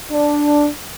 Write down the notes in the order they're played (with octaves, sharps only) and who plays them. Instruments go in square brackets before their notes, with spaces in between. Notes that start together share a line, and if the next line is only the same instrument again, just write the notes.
[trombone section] D4